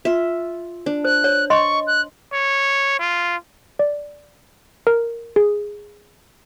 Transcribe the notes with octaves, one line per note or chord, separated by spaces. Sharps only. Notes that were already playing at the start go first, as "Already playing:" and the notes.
F4 E5
D4
C5 F#6
C#5
D#5 C6 C#6
F#6
C#5
F4
D5
A#4
G#4